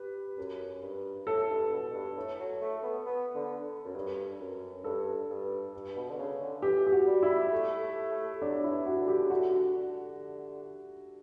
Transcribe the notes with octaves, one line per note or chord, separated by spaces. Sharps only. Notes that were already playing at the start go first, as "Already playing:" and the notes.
Already playing: G4 B4
F#2
G2
A2 A4
G2
B2
G2
A2
F#3
A3
B3
B3
D3
F#2
G2
F#2
G2 A4
G2
G2
B2
D3
C#3
D3
E3 G4
G4
F#4
G3
E4
A3
A3
A3
F#3 D4
E4
E3
F#4
D3
G4
C#3
D3 F#4
D3